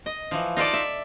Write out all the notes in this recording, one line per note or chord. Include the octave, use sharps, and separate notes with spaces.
D#5
E3 F3
D#4 F4 A4 D5
E5